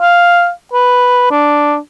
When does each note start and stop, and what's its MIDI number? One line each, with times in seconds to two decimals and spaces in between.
0.01 0.50 77
0.73 1.28 71
1.31 1.77 62